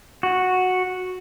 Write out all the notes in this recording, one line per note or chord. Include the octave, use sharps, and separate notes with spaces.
F#4